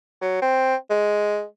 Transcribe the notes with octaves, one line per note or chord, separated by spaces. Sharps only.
F#3
C4
G#3